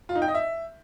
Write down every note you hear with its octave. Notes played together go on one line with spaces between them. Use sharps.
F4
D#4
G5
D#5
E5